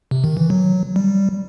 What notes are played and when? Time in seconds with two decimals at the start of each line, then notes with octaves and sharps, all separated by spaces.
0.11 C3
0.24 D#3
0.37 E3
0.50 F#3
0.96 G3